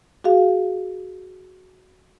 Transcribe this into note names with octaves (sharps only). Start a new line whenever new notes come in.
F#4 G#4 F5